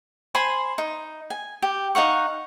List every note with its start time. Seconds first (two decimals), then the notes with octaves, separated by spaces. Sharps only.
0.35 C5 G#5 B5 C6
0.78 D#4
1.30 G#5
1.62 G4
1.95 D#4 F5 F#5 C#6